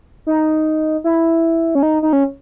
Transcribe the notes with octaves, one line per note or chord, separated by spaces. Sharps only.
D#4
E4
C#4
D#4
D#4
C#4